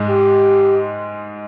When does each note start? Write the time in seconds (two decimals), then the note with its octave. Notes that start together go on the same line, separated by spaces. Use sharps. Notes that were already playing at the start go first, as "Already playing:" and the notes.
Already playing: G#2 G#3
0.08 G4